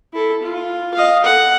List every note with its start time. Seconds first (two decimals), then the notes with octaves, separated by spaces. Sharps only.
0.13 E4 A4
0.42 F4
0.94 D#5 F5
1.24 A4 F#5